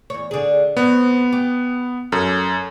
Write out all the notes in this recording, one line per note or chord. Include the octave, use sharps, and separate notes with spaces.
E2 C#5
D3 G#4
F2 B3 C4 C#5
G4
F#2 A4